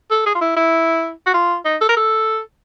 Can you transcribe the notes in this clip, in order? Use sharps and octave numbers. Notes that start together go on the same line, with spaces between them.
A4
G#4
F4
E4
E4
F#4
F4
D#4
A4
A#4
A4